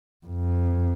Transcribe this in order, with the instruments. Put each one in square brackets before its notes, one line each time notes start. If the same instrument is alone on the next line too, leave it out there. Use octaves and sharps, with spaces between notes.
[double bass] F2